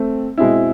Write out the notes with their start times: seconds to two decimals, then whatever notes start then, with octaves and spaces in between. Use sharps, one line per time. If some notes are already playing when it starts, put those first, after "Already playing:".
Already playing: A3 C4
0.38 B2 G#3 C4 E4